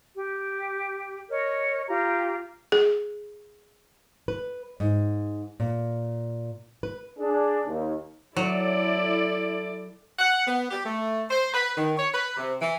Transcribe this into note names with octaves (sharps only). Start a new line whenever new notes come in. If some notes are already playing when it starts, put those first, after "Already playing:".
G4
A#4 C#5 D#5
F4 G4 A#5
G#4
B4
G#2
A#2
B4
D4 G#4
D#2
F#3 E4 A4 D5
F#5
B3
G4
A3
C5
B4
D#3
C#5
B4
C3
E3